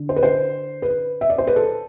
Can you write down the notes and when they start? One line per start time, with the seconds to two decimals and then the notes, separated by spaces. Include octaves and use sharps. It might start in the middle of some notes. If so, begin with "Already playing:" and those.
Already playing: D3
0.09 C5
0.16 B4
0.23 C5
0.82 B4
1.21 E5
1.30 D5
1.38 C5
1.47 B4
1.56 A4